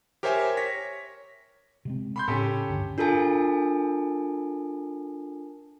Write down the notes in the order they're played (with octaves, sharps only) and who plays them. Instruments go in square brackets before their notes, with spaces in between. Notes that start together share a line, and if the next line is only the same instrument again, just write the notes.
[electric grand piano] G4 A#4 C5 C#5 E5 G#5
C#5 A#6 B6
[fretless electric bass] C3 G#3 C4
[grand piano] B5 C6 G6
[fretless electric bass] A2 C#3 [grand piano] C#4 G4 A4
[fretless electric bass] D2 G2 D3
[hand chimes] D4 F4 A4 A#4 G#5 A5